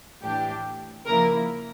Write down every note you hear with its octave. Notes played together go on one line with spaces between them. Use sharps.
A2 E3 A3 D4 G4
C#3 F3 A#3 E4 A#4